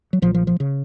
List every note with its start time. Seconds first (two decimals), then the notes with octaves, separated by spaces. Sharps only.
0.13 F#3
0.22 B1 A#2 F3
0.35 F3
0.47 F3
0.60 C#3